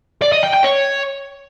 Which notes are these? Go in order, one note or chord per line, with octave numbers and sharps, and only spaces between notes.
D5
D#5
G5
G5
C#5